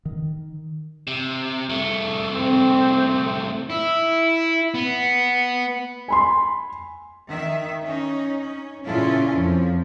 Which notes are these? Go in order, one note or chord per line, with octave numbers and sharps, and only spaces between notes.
D#3
C3
C2 A3
C4
E4
B3
G#5 B5 C6
D#3 E5
C#4 D#4
C#4
A#2 C#3 C#4 E4 F4 A4
F2 F3